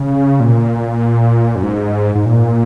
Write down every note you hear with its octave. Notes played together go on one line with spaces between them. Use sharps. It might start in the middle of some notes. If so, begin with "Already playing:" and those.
Already playing: C#3
A#2
F#2
G#2
G#2
A#2